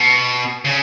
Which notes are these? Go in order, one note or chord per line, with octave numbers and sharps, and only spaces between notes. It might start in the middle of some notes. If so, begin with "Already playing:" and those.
Already playing: B2
C#3